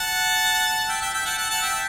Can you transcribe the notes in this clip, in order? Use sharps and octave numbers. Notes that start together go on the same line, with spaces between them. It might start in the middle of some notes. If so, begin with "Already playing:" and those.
Already playing: F#5 A5
E5 G5
E5 G5
E5 G5
F#5 A5
F#5 A5
F#5 A5
E5 G5